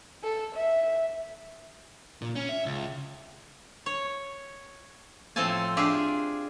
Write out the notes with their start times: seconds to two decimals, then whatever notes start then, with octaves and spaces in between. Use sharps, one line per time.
0.24 A4
0.56 E5
2.22 A#2
2.36 C#4
2.49 E5
2.66 C#2
3.86 C#5
5.36 A2 F3 C4 A4 G#5 A5
5.77 D4 F4 G4 G#4 E5